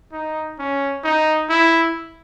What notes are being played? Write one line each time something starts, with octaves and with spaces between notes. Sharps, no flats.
D#4
C#4
D#4
E4